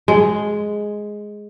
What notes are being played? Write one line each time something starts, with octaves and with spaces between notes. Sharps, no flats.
G#3